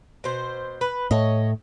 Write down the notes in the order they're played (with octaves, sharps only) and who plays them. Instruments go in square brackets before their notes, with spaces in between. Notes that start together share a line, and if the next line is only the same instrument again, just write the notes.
[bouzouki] B2 C5
B4
[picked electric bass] A2 [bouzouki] C#5 D#5